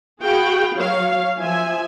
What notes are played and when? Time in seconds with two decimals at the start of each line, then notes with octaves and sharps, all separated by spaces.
0.21 F#4 G#4 F5 G5 B5
0.74 F#3 C#5 F5
1.39 F3 E5 G#5